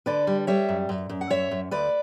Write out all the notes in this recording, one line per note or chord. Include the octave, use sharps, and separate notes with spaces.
D3 B4 D5
G3
G3 C#5 E5
F#2
F#2
F#2
F#5
F#2 C#5 E5
F#2
D2 B4 D5